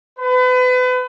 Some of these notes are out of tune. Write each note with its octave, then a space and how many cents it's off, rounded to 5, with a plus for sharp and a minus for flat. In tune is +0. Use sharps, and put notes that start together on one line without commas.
B4 +35